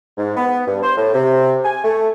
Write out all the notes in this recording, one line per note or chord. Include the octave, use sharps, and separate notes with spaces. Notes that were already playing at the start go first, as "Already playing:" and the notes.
G#2
B3
G2
C5
A2
C3
G#5
A3